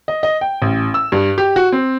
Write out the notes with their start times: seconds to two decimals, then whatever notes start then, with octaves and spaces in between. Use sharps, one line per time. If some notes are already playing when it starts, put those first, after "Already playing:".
0.08 D#5
0.23 D#5
0.41 G5
0.62 A1
0.94 E6
1.12 G2
1.38 G4
1.56 F#4
1.72 C4